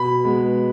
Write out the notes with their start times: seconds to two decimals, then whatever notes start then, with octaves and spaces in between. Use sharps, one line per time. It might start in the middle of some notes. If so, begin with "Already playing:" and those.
Already playing: B2 B5
0.24 G#3 B3